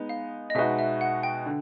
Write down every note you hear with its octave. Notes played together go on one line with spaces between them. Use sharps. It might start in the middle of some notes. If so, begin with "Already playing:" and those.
Already playing: G#3 B3 D#4
F5
D#5
B2 G#3 B3 D#4 F#4 E5
E5
F#5
G5
D3